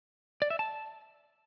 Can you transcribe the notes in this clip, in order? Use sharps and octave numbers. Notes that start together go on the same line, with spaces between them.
D5
E5
A5